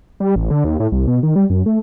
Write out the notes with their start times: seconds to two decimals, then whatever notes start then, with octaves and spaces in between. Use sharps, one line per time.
0.20 G3
0.36 A1
0.51 D3
0.64 D#2
0.80 A2
0.92 C2
1.08 B2
1.23 D#3
1.36 G3
1.50 F#2
1.66 A3